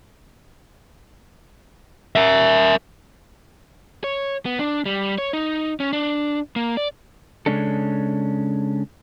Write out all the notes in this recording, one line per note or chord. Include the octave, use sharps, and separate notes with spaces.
A#4 E5
C#5
B3
D4
G3
C#5
D#4
C#4
D4
A#3
D5
C#3 G#3 C#4 D4 A4